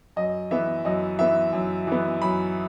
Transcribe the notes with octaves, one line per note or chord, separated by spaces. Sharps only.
F#2 D#5
E3 B3 E5
F#2 D#5
E3 B3 E5
F#2
E3 B3
F#2 B5